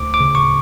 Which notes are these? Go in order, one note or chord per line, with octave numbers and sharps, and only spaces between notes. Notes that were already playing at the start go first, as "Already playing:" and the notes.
Already playing: D2 D6
D6
C#3
C#6